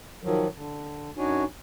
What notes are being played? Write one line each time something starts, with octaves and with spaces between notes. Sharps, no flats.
D#3 F3 F#3
D3
F#2 D4 D#4 F#4 C#5 G#5